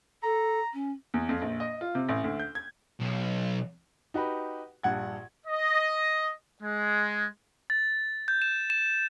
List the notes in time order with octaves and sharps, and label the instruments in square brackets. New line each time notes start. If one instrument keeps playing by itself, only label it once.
[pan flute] A4 [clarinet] A#5
[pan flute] C#4
[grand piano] E2
F2
A#1
D#5
F4
C3
A1
D2
G6
G#6
[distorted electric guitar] B1
[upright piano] D#4 F#4 G4 B4
A#1 G2 F#5 G#6
[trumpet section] D#5
G#3
[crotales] A6
G6
E7
E7